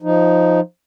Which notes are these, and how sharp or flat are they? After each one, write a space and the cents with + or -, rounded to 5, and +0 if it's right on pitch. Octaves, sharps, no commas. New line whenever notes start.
F3 +0 D#4 +0